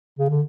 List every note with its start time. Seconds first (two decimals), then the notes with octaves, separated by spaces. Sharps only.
0.19 C#3
0.30 D3